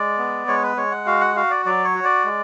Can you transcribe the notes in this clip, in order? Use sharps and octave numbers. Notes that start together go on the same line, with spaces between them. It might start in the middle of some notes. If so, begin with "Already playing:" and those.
Already playing: G#3 D5
B3
G#3 C#5
B4
G#3 C#5
F#5
F#4 F5
F#5
F#4 F5
D5
F#3 D5
C#5
F#4
D5
G#3